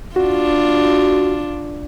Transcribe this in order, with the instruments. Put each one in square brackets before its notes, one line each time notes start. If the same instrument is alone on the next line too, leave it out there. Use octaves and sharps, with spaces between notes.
[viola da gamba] D4 F4 [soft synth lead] F#4